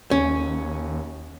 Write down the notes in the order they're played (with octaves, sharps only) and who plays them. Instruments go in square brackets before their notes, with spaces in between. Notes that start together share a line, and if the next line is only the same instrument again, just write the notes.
[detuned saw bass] D#2 [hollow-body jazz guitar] C#4